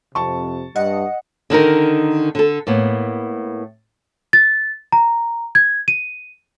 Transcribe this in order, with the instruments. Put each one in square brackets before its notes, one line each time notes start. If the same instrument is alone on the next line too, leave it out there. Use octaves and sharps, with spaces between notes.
[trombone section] F2 C3 [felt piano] A5 C#6
[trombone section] G2 [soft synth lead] D#5 [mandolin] F#5
[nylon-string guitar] D3 D#3 D#4 A#4
D3 A4
A2 A#3 B3
[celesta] A6
A#5
G#6
D#7